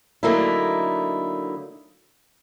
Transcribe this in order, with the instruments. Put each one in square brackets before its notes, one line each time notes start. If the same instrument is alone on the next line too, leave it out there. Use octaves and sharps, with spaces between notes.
[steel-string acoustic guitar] D3 F#3 A3 A#3 D#4 E4